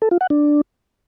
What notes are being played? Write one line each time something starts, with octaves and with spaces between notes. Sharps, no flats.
A4
F4
F#5
D4